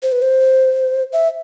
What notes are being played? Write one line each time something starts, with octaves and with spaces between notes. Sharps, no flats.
C5
B4
C5
E5